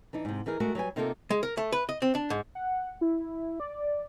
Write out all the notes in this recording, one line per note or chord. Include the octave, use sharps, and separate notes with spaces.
E3 D4 D#4
G#2 C3
E3 D#4 G#4 A#4
G#3 A3 F#4 A4 A#4
F#3 G3 B4 G#5
C3 A#3 D#4 F4 A4 A#4
G#3
A#4
A3
B4
D#5
C4
D4
G#2
F#5
E4
D5